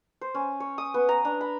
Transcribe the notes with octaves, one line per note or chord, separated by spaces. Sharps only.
C5
C#4
C#5
D#6
B3
A#5
D4
B5